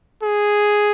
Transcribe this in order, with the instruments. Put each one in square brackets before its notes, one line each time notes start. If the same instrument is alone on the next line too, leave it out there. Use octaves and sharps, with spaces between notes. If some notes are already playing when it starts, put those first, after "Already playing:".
[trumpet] G#4